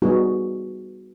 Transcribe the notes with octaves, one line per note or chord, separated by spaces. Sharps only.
G3 B3 D#4 F#4 G#4